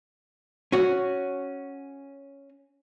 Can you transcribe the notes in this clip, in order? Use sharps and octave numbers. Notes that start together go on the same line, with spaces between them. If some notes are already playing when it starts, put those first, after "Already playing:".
C#4 F#4